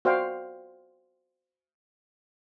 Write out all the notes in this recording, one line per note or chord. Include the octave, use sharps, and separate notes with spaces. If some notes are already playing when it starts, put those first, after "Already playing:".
F#4 C5 D5 F5 G5